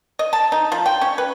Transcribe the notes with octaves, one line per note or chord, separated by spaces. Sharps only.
D#5
A5
D#4
F3
G5
C#4
B4